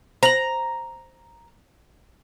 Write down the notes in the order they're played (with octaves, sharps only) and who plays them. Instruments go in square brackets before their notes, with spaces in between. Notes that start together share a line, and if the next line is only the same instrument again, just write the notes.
[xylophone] C5 F#7 [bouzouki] A#5